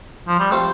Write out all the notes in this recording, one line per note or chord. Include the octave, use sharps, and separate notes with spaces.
F3
G3
F3 A3 C4 G4 C5